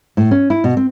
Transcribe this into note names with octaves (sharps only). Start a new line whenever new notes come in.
A2
C#4
E4
B2
C4